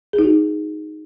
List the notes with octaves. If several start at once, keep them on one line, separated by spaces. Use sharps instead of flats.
G#4
D#4
F#4